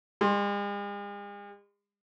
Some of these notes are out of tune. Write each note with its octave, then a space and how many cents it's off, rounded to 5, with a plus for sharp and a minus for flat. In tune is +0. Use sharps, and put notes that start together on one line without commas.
G#3 -45 C6 +10